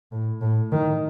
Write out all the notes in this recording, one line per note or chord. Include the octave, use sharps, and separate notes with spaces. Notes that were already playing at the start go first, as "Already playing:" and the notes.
A2
A2
D#3